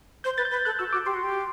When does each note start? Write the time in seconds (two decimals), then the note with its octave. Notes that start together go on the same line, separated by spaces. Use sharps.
0.24 C5 G6
0.37 B4 A6
0.45 G6
0.51 B4
0.65 A4 F#6
0.79 F#4 E6
0.93 F#4 D6
1.06 G4 C6
1.14 F#4
1.23 G4